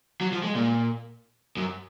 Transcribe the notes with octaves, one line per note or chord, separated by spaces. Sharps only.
F#3
F3
G#3
A#2
F#2